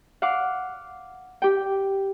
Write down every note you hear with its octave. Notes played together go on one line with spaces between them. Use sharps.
F5 F#5 D6
G4 G5